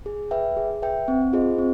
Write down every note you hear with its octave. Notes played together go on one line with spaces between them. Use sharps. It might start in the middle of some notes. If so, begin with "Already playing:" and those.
G#4
B4 E5 G5
G#4
B4 E5 G5
C4
F4 G#4 C5 D#5
C4